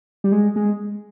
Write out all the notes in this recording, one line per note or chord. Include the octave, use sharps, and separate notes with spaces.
G3
G#3
G#3